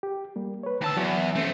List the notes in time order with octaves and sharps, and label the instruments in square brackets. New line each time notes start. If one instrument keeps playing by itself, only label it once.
[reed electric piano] G4
G3 A#3
B4 C#5
[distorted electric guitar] D#2 A5 [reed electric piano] D3 E6
[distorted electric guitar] E2 [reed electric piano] E3 F#3
[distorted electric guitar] A3 C4 [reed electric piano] C#4